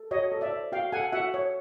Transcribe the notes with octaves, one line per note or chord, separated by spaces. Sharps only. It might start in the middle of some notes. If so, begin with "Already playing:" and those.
Already playing: A4
F#4 C#5 D#5
A4
D5 E5
C5
F#4 F5 G5
A4 F#5 G#5
F#4 E5 F#5
C#5